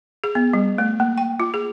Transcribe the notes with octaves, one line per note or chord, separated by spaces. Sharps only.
G#4
B3
G3
A3
A#3
G5
F4
G#4